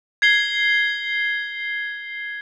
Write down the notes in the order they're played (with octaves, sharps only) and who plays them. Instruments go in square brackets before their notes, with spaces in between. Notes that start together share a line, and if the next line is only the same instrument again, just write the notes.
[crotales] G#6 C7 G7